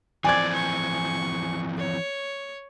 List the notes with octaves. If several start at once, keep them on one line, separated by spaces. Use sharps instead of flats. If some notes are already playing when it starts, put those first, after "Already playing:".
E3 F3 C4 D5 G#5 G#6
C#6
C#5